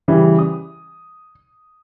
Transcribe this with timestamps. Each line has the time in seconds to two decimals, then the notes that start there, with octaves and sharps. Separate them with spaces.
0.08 C#3 E3 G3
0.39 D#6